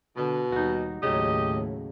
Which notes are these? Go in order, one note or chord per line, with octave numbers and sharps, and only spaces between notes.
B2 D3
D#2 G3 D#4 F#4
D#2 A2 C#3 F#3 G4 D#5